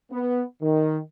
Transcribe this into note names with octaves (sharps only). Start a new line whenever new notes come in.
B3
D#3